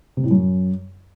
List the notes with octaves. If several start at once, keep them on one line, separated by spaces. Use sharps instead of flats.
C3
A2
F#2